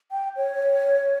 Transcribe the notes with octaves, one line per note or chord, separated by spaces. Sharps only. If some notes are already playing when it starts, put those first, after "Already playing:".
G5
C#5